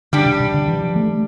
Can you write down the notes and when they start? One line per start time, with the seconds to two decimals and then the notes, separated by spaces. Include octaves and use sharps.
0.13 D3 G3 D4 G4
0.26 C3
0.40 C3
0.54 D3
0.68 E3
0.82 F3
0.96 A3